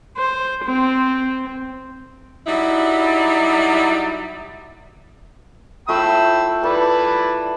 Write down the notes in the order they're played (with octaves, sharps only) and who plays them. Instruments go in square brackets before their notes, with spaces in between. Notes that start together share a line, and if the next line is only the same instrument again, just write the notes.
[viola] C5
C4
[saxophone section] F#3 G3 D#4 E4
[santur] A3 F4 [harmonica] G5 B5 E6
[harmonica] E4 B4 D5 [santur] A4